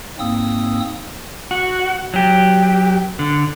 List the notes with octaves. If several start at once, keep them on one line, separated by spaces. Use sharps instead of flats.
G#2 A#3 C4 D#6 E6
F#4
F#3 G4
D3